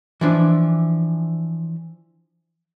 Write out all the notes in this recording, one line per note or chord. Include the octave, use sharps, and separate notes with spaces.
E3 F3 D4